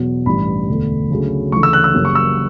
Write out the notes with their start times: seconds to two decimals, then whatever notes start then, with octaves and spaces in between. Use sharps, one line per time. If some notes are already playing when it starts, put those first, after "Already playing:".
Already playing: E2 B2 F#3
0.26 A1 G2 E3 G3 B5
0.69 E1 D2 D3 A3
1.10 D2 C#3 F#3 A3
1.52 D2 C#3 E3 A3 C#6
1.63 E6
1.73 F#6
1.84 E6
1.94 F#1 F#2 C#3 G3
2.05 C#6
2.15 E6